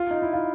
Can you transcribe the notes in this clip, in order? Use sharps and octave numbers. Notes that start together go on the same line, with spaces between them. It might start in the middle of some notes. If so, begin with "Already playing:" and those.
Already playing: F4
D#4
E4
F4